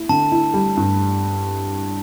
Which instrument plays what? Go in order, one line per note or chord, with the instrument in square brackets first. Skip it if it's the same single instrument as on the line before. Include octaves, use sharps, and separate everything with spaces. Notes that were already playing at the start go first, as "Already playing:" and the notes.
Already playing: [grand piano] E4
[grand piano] D3 [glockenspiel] A5
[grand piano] E4
G3
G2